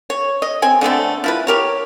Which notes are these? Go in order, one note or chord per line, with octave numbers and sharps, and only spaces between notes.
C#5
D#5
C4 G#5
D3 A3 B3 C4
F3 E4 B4
G4 A#4 C#5